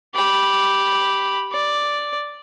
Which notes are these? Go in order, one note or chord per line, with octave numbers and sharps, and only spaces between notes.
G4 B5
D5